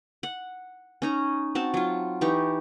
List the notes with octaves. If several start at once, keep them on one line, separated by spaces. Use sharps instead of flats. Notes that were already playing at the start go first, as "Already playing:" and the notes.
F#5
C#4 D#4 A#5
C4 F#4 A5
F#3 F4
E3 D#4 G4 C#6